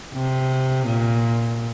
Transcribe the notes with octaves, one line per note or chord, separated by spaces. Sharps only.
C3
A#2